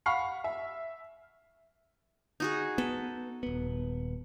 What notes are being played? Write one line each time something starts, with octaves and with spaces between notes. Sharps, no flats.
F5 F#5 B5 C#6 F6 C7
E5
D#4 F#4 G#4
B3 A4
D#1 B3